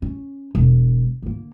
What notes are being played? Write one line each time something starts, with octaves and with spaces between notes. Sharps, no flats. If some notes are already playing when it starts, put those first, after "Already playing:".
C#4
E1
D3 A#3